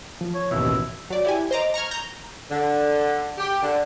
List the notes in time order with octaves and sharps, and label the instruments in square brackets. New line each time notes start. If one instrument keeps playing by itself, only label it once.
[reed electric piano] F3
[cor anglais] C#5
[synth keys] A1 D#2 B2 [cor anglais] E4
[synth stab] F#3 D5
E4 G4 G#5
C5 D#5 A#5 D6
A#5 C#6 F6 G#6
A#5 G6
[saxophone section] D3
G4
D3